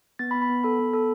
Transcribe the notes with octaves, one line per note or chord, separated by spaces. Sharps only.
B3 A6
B5
B3
B5
B3
A4 B5
B3
A4